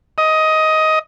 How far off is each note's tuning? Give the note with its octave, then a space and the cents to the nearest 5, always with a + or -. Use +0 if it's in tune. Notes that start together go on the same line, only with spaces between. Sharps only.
D#5 +15